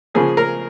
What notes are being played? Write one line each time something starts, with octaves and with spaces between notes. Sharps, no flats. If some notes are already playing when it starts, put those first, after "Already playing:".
C#3 F3 A#3 G#4
A#4